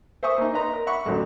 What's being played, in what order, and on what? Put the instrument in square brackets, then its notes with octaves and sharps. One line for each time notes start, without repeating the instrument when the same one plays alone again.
[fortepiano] C5 E5 G#5 C#6 D#6
A#3 D#4
B4 D#5 A#5 C6
A#4
E5 F#5 B5 C#6
A1 D2 F#3